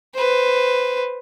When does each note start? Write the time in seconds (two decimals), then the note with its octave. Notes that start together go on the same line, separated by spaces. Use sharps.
0.15 B4 C5